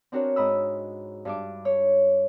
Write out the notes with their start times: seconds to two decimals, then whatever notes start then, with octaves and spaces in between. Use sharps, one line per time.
0.12 C4 D4 F#4 A#4 C#5
0.36 G#2 D#5 B5 E6
1.25 G2 D4 D6
1.65 C#5